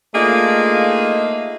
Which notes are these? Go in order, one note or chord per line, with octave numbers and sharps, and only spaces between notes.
A3 A#3 D4 D#4 F4 G#4